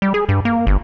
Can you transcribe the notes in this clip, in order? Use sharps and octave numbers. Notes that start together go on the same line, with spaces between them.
G3
G#4
G2
A#3
G1